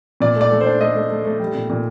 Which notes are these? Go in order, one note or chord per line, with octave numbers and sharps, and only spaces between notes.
A#2 D5
A3
D5
A3
C5
D4
A3 D#5
A3
A3
A3
G3
A#2
A#2